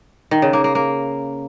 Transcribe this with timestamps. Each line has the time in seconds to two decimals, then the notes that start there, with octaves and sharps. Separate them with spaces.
0.31 D#3
0.42 C#3
0.53 A#3
0.64 A#3
0.75 A#3